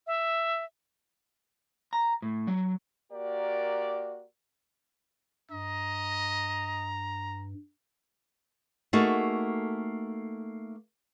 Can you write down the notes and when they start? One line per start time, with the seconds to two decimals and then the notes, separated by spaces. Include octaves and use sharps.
0.07 E5
1.93 A#5
2.22 A2
2.47 F#3
3.12 A#3 F#4 G4 A#4 D5
5.51 G2 D#5 A#5
8.93 A3 A#3 D#4 F#4 G#4 A4